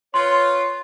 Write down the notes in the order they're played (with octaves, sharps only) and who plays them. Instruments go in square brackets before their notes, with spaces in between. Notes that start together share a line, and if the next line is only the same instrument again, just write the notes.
[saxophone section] F4 B4 C#5 [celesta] C6